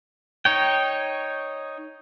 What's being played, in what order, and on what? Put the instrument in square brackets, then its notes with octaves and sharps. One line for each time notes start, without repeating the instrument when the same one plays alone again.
[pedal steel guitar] D#4 C#5 G5